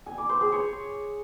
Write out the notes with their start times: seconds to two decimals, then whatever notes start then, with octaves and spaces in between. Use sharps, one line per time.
0.06 G#5
0.18 D6
0.29 C5
0.41 G#4
0.52 C#5